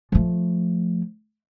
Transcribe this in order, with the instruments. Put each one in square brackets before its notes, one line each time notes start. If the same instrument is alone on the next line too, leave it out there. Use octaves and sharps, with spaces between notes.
[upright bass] F3 A3